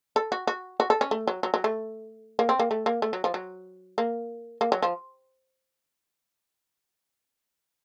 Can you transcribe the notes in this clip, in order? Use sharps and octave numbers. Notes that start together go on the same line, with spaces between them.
A4
F#4
F#4
F#4
A4
C#4
A3
F#3
F#3
F#3
A3
A#3
C4
A#3
A3
A#3
A3
F#3
F3
F#3
A#3
A#3
F#3
F3